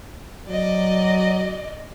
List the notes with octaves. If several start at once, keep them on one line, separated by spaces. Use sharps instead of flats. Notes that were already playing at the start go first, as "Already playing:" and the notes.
F#3 D5 D#5